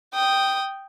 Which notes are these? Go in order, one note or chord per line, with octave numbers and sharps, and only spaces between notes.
G5 D#6